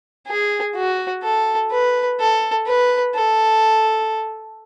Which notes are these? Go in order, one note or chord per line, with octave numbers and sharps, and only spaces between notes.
G#4
F#4
A4
B4
A4
B4
A4